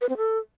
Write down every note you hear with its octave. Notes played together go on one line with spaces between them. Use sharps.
B4
C4
A4